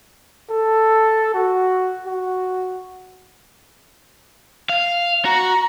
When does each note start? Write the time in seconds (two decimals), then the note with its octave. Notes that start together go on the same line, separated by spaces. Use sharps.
0.50 A4
1.34 F#4
2.07 F#4
4.69 F5
5.25 F#4 A#5